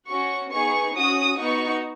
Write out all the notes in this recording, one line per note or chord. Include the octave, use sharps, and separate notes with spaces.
C#4 F#4 C#6
B3 D#4 G#4 C#6
C#4 F#4 D#6
B3 D#4 F#4 C#6